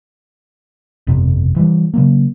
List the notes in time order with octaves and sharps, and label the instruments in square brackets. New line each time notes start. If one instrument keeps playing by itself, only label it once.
[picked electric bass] G1 F2 C3
E3 G3
C#3 F#3 A#3